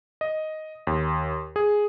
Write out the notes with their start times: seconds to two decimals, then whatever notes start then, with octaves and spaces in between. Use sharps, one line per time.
0.21 D#5
0.87 D#2
1.56 G#4